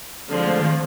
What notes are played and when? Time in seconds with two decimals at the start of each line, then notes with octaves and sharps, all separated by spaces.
0.29 D3 F3 G#3 C4 F4
0.45 A3
0.59 D#3